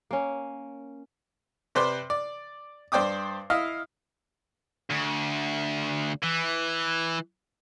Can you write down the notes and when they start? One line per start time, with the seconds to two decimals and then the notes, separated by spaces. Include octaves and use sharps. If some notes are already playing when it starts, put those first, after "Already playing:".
0.11 A#3 C#4
1.75 C3 B4 C5 D5 C6
2.10 D5
2.92 G2 C5 D5 G5 D6 D#6
3.50 E4 D#5 F5
4.91 D2
6.23 E3